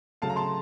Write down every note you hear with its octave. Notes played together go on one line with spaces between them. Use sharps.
C#3 F#3 A3 F5 A5
A#5
A5 C6